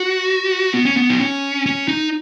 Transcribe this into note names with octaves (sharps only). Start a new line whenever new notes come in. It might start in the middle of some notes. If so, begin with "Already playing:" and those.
Already playing: F#4
B3
C#4
B3
D#4
C#4
C#4
D#4